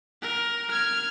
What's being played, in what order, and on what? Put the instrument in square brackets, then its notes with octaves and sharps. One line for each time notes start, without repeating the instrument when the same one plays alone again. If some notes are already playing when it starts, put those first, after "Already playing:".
[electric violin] A#4
F6 G#6